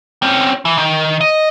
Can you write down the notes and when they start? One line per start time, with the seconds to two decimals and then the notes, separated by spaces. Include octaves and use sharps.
0.22 C4 C#4
0.65 E3
0.77 D#3
1.21 D#5